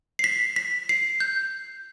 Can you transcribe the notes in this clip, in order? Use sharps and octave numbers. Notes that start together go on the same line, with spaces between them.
C7
B6
B6
C7
G6